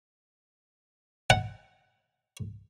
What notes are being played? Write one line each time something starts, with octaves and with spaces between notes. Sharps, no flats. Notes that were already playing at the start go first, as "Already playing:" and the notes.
F#5